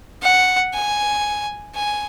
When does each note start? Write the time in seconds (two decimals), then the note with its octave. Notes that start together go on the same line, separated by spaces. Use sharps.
0.22 F#5
0.74 G#5
1.75 G#5